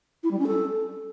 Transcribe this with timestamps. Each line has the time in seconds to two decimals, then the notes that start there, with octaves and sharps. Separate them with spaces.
0.23 E4
0.31 G3
0.39 C#4
0.47 A4